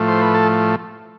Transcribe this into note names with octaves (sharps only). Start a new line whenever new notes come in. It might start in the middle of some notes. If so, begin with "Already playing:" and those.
Already playing: A2 F3 A3
C5
B4
A4